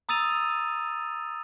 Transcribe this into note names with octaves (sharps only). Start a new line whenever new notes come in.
A#5 D#6 E6 A6 D#7 F7